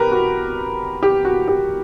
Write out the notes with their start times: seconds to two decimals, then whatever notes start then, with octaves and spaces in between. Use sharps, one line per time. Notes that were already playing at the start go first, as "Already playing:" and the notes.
Already playing: B2 G4 A#4 B4
0.12 F#4
1.03 G4
1.25 F#4
1.48 G4